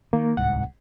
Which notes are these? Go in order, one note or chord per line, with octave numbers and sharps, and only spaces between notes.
D#3 A#3
D1 C2 G#2 F#5